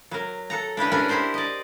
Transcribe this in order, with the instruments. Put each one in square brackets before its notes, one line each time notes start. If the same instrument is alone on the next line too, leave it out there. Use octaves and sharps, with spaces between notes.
[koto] F#3 A#4
A4 F#5 A#5
D4 E4 G4 B4
C#4 D4 A#4 B4 G#5
E4 G4 A#4 C5 E5
D5 D#5